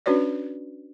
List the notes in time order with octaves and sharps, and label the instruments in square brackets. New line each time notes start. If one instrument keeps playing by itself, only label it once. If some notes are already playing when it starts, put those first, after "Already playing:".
[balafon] C#4 D4 F#4 B4 C#5 D5